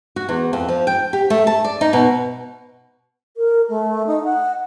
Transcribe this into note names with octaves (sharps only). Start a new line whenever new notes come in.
F#4
E2
F2
F3
G5
G4
A3
A5
D5
D#4
B2
A#4
A3
D#4
F#5